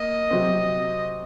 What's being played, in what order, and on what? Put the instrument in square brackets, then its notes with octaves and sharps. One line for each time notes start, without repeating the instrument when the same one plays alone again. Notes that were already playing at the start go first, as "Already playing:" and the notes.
Already playing: [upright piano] A#3 [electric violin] D#5
[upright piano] C3 F#3 C4